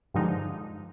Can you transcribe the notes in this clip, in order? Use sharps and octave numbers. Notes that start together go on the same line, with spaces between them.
G2 D3 F3 G#3 D#4